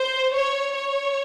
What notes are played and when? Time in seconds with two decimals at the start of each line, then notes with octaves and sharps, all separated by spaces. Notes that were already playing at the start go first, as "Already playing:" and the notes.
Already playing: C5
0.33 C#5
0.72 C#5